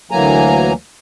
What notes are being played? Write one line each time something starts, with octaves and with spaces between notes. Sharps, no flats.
D2 E3 F#3 A#3 G#5 A#5